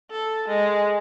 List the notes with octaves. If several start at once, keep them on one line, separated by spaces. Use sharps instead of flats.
A4
G#3